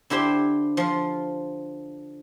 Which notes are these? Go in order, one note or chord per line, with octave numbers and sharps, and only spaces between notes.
D3 E4 G4 C5 G5 C6
F3 F4